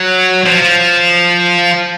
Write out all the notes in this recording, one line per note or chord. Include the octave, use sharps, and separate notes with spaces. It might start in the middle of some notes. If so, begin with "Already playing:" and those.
Already playing: F#3
F3